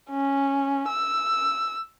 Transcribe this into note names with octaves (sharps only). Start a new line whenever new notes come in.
C#4
E6